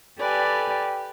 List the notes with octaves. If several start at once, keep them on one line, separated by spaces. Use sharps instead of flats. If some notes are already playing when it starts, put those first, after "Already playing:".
G4 A4 B4 D5 G#5